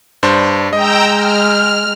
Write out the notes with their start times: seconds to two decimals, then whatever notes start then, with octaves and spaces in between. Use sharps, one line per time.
0.23 G2 D4 C5
0.73 G#3 D#5 G5 A#5 E6
1.14 F6